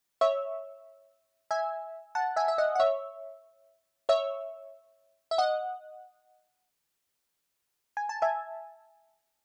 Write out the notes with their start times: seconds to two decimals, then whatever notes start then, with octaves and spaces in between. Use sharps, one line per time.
0.21 C#5 E5
1.51 E5 G#5
2.15 F#5 A5
2.36 E5 G#5
2.48 E5
2.58 D#5 F#5
2.75 F#5
2.80 C#5 E5
4.09 C#5 E5
5.31 E5
5.38 D#5 F#5
7.97 G#5
8.09 A5
8.22 E5 G#5